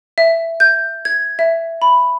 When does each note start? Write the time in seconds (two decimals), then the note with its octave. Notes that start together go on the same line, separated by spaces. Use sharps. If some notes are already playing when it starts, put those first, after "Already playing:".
0.18 E5
0.60 G6
1.05 G#6
1.39 E5
1.82 B5